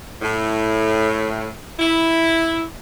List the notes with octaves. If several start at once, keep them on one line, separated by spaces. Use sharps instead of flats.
A2
E4